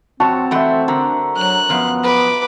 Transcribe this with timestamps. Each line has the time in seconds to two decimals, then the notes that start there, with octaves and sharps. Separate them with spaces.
0.20 F2 C4 F#4 C#5 A5
0.51 E3 A3 C5 E5 F#5
0.88 D3 A#4
1.36 F#3 F#6
1.69 F#2 F3 B3 F5
2.03 B4 D6